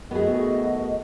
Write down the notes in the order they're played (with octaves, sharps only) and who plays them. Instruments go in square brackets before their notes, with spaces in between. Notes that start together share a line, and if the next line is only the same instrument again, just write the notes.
[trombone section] D#3 A3 F#4 [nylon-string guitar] B3 G#4 [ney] D#5